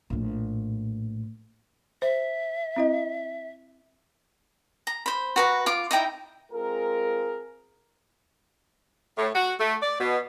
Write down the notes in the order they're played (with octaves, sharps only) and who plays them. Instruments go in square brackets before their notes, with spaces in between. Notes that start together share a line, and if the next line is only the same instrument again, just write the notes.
[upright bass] A#1 A2
[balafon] C5 [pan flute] E5
[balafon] C4 E4 D#5
[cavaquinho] A#5
C5 B5
F#4 B4 A#5
F4 D6
D#4 E4 G5 A#5
[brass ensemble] G#3 C4 F4 G#4 A#4
[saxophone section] A2
F#4
A3
D5
B2